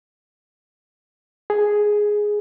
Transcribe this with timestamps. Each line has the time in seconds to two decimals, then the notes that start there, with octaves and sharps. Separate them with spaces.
1.50 G#4